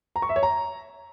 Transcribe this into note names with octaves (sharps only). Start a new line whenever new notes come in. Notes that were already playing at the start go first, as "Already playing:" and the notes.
A#5
C#6
E5
C#5
A#5